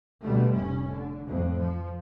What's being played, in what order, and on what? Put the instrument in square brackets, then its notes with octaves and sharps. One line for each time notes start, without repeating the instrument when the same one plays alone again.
[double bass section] B2 D3 G3 A3
F1 A2 C#4
D3
F2 A2
F3